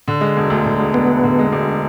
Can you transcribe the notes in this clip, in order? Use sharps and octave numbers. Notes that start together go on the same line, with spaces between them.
D3
G#3
E1
D2
D3
G#3
E1 B3
D2
D3
G#3
E1